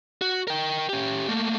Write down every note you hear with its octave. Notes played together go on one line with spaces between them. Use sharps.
F#4
A#4 G5
C#4 G4
A3 A#3